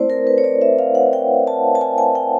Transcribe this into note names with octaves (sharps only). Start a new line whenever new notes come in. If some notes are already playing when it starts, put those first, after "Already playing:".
Already playing: A3 C4 E4 C5 D5
A#4
B4
C#5
D5
E5
F5
F#5
G5
A5
A5
G#5
G#5
G5